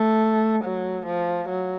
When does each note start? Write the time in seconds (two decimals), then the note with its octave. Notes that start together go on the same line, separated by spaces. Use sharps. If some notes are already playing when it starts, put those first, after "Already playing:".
Already playing: A3
0.64 F#3
1.06 F3
1.49 F#3